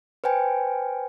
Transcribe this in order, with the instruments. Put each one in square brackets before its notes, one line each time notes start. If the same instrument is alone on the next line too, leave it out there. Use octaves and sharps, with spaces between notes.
[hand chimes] B4 C5 G5 G#5